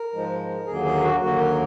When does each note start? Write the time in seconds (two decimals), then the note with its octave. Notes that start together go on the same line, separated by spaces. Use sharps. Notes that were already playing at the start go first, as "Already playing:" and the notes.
Already playing: A#4
0.13 G#2 F3 G#3
0.67 D#2 D3 F#3 A#3 G#4
0.85 G#4
1.03 F#4
1.20 D#2 D3 F#3 A#3 F#4
1.38 A#4